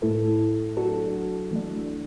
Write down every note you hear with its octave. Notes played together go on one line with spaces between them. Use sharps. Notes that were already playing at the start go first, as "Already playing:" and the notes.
A2 A3 E4 A4
F#3 D4 F#4 A4
E3 A3 D4